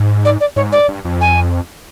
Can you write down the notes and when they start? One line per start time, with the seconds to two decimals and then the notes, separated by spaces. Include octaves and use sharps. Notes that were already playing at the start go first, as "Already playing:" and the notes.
Already playing: G#2
0.25 D5
0.40 D5
0.56 G#2 C#5
0.72 D5
0.88 G2
1.05 F2
1.21 G#5